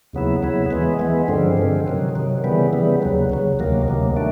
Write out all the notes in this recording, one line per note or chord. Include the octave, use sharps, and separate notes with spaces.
D#2 C#3 F#3 B3 E4
D#2 C#3 F#3 B3 E4
E3 G#3 B3
E3 G#3 B3
G2 D3 F3 G#3 C4
G2 D3 F3 G#3 C4
C3 D#3 F#3
C3 D#3 F#3
C#3 E3 G3 B3
C#3 E3 G3 B3
D#2 C#3 F#3
D#2 C#3 F#3
D2 C3 D#3 F#3 A#3
D2 C3 D#3 F#3 A#3
A3 D4